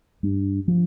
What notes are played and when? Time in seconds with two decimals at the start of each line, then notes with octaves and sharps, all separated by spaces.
0.23 G2
0.68 F3